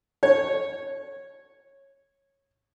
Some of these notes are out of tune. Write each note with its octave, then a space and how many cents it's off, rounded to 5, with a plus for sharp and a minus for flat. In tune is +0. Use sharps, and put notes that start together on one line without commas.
C#5 -15